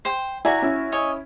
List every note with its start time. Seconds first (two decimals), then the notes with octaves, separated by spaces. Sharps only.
0.05 C5 G5
0.45 E4 F#4 D5 G#5 A#5
0.62 C#4 E4
0.92 C#5 D#5 G#5